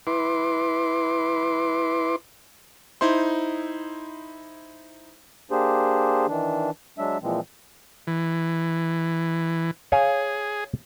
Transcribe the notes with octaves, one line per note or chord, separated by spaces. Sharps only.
E4 B4 C6 D6
D#4 E4 C5 C6
A#3 D4 G4 G#4 C5
D#3 E3 D4
F#3 G#3 D4 E5
A#2 E3 F3 G#3 C4
E3
G#4 C#5 F5 G#5